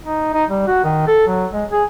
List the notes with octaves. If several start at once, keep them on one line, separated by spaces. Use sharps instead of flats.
D#4
D#4
G3
F#4
D#3
A4
F#3
G#3
G#4